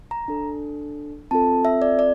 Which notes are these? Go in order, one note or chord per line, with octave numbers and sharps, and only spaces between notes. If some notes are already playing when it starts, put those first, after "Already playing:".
A#5
D4 A4
C4 F4 A4 A5
E5
D5
D5